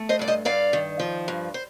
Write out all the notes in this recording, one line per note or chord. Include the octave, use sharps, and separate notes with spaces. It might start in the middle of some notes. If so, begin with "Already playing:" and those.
Already playing: A3
C5 D#5
G2 D5
C5 D#5
G2 D5 F5
D#3
F3
G2
C5